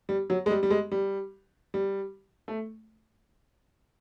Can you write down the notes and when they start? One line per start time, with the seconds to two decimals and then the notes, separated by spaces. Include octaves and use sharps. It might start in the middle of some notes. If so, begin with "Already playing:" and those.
0.09 G3
0.30 F#3
0.46 G#3
0.50 G3
0.63 G3
0.70 G#3
0.92 G3
1.74 G3
2.48 A3